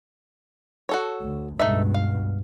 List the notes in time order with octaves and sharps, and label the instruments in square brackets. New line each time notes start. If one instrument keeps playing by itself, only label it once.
[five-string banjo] F#4 A4 C#5
[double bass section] D2
[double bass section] C#2 G2 B2 [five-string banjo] A3 D#4 E5
[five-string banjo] F5